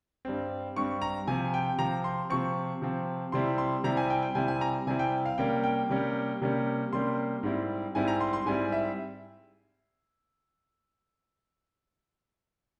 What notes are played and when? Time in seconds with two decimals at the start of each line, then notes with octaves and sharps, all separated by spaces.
0.25 G2 G3 C4
0.76 G2 G3 C4 C#6
1.02 A#5
1.27 C3 F3 C4 G#5
1.54 G5
1.78 C3 F3 C4 A#5
2.04 C6
2.30 C3 F3 C4 C#6
2.82 C3 F3 C4
3.32 C3 G3 C4 E4 C6
3.58 C6
3.84 C3 G3 C4 E4 A#5
3.97 G#5
4.10 G5
4.23 G5
4.35 C3 G3 C4 E4 G#5
4.48 G#5
4.61 A#5
4.87 C3 G3 C4 E4 G#5
4.99 G5
5.26 F5
5.38 C3 G3 A#3 C#4 G5
5.63 G5
5.89 C3 G3 A#3 C#4
6.41 C3 G3 A#3 C#4
6.93 C3 G3 A#3 C#4 C6
7.43 G#2 G3 C4 E4
7.95 G#2 G3 C4 E4 G#5
8.08 A#5
8.20 C6
8.33 C6
8.46 G#2 G3 C4 E4 G#5
8.72 E5